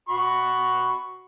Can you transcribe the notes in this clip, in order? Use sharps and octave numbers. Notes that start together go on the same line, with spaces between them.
F#4 B5 C#6